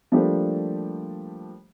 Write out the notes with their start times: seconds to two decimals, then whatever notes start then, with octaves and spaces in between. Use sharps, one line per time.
0.12 F3 G3 A3 A#3 D4 G4